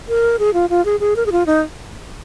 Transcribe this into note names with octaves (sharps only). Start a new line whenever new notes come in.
A#4
G#4
F4
F4
G#4
G#4
A#4
G#4
F4
D#4